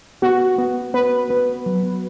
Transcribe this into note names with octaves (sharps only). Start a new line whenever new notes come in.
B3 F#4
B3
B3 B4
B3
F#3